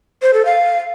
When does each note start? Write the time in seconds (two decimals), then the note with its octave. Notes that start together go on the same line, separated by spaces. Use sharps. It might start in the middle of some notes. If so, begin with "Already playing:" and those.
0.22 C5
0.34 A4
0.45 F5